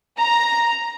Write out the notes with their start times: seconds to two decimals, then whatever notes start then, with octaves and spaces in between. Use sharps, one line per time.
0.17 A#5